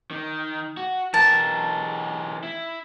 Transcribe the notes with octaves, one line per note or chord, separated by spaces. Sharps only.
D#3
F#4
E3 G4 A#4 A5
E4